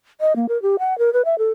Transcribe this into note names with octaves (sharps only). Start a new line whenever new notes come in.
D#5
A#3
A#4
G4
F#5
A#4
B4
E5
A4